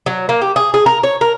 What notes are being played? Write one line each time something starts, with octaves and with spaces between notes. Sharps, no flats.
F#3
A#3
G4
G#4
G#4
A#4
C#5
A#4